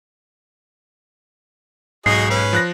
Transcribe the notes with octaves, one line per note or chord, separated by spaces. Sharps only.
B1 G#2 F#4 G#4 D#5 C7
C#4 B4
F3 F#6 A#6